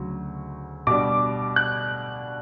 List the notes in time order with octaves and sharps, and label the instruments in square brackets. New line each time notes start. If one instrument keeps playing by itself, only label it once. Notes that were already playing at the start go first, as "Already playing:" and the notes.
Already playing: [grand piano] D2 C#3 F#3
B2 G3 D4 D6
F#6